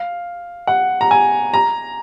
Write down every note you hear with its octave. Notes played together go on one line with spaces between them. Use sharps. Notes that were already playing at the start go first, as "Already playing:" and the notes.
Already playing: F5
F#5
A#5
G#5
A#5